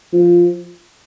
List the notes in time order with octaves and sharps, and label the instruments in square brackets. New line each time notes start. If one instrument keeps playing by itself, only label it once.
[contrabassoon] F3